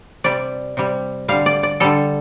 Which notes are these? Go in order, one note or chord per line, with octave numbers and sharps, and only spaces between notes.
C3 G3 D5
C3 G3
D3 G3 F5
D5
D5
D3 G3 A4